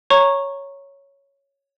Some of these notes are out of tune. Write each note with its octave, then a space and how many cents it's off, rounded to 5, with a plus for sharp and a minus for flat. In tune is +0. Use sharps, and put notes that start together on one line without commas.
C#5 +0 A#5 +0 C#6 -10